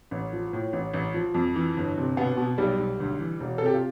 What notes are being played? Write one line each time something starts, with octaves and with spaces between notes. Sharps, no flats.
A1
F3
A2
A1
A1
F3
F2
E3
G1
C3
B2 B3
B2
B1 G3
B1
D2
E3
E1
A4
C3 G4
F4